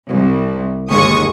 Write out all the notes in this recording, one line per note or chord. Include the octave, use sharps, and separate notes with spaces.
C2
G1 D#2 G#3 C#6 D#6